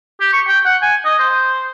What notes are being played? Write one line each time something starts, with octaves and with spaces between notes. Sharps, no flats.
G4
C#6
G5
F#5
G#5
D#5
C5